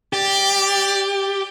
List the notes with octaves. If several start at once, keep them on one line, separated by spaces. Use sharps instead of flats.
G4 D5